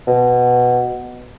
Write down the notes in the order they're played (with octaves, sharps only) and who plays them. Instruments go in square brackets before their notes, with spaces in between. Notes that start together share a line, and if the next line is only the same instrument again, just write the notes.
[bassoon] B2